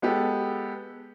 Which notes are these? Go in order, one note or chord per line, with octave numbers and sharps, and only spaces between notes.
G#3 B3 G4 A4